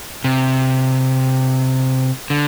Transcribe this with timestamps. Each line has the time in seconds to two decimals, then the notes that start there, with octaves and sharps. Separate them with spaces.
0.24 C3
2.30 D3